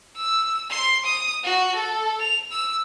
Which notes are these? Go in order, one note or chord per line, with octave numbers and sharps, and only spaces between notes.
E6
C6
D#6
F#4
A4
F7
E6